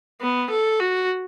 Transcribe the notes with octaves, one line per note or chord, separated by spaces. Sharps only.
B3
A4
F#4